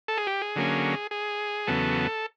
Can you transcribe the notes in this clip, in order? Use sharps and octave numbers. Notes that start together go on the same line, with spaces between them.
A4
G#4
G4
G#4
D3 F#3 A#3 C#4
G#4
E2 C#3 F#3 B3 A4